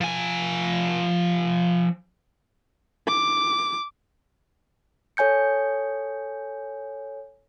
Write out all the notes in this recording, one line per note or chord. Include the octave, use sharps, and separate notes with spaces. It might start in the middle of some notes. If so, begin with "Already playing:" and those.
F3 G#5
D6
A4 C#5 G#5 G6 C#7